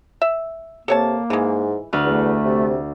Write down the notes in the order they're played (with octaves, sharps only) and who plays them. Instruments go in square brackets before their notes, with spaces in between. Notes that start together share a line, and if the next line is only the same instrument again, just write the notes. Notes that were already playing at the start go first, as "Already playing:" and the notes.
[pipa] E5
[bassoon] C3 [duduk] A#3 [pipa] A4 C#5 A5
[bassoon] G#2 [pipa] E3 G#3
[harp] D2 F6 [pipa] B4
[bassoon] E2 [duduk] A3
[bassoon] C3